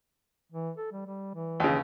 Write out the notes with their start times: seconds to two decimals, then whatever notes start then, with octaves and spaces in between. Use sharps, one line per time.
0.52 E3
0.77 A4
0.92 G3
1.07 G3
1.35 E3
1.60 D#2 C#3